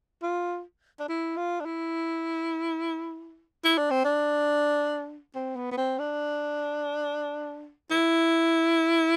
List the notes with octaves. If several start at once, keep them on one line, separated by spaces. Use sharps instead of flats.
F4
D4
E4
F4
D4
E4
E4
D4
C4
D4
C4
B3
B3
C4
D4
E4